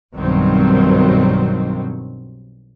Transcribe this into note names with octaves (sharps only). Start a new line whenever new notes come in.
B1 G2 B2 D#3 F#3 C4